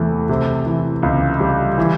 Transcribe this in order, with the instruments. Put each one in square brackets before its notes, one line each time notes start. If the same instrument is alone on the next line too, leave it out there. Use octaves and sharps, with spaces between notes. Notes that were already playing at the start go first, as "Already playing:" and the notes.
Already playing: [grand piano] E2 C3 E3 A3
C3
E3
C#2
G3
E3